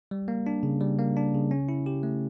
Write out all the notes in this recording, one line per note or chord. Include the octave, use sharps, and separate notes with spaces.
G3
A#3
D4
C#3
G3
A#3
D4
C#3
C#4
E4
G4
A3